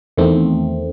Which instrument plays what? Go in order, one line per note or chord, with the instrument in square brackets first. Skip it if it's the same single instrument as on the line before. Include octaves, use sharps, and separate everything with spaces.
[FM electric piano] E2 D#3 A3 C4